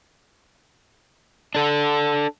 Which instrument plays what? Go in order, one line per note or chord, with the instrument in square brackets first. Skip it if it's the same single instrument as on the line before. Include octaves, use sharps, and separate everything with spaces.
[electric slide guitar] D4 A4